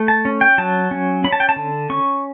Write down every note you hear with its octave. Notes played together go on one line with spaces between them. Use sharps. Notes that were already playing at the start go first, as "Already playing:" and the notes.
Already playing: A3
A5
C#4
G5
F#3 A5
C#4
C#4 B5
A5
G5
A5
D3
C#4 C#6